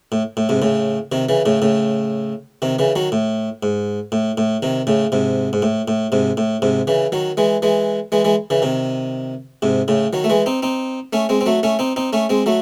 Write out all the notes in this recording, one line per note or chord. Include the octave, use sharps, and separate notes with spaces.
A2
A2
G#2 C3
A2 C#3
C3 D#3
C#3 E3
A2 C#3
A2 C#3
C3 D#3
C#3 E3
D#3 F#3
A2
G#2
A2
A2
C3 D#3
A2 C#3
G#2 C3
G#2
A2
A2
G#2 C3
A2
G#2 C3
C#3 E3
D#3 F#3
E3 G#3
E3 G#3
E3 G#3
E3 G#3
C#3 E3
C3 D#3
G#2 C3
A2 C#3
D#3 F#3
A3
E3 G#3
C4 D#4
C4 D#4
A3 C#4
G#3 C4
C4
F#3 A3
A3 C#4
C4 D#4
C4 D#4
A3 C#4
G#3 C4
F#3 A3